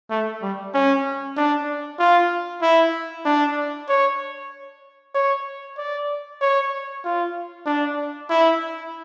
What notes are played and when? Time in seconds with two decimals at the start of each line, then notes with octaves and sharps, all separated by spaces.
0.10 A3
0.42 G3
0.74 C#4
1.37 D4
1.99 F4
2.62 E4
3.26 D4
3.89 C#5
5.15 C#5
5.78 D5
6.41 C#5
7.04 F4
7.66 D4
8.30 E4